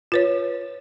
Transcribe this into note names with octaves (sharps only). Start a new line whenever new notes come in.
F4 B4 C#5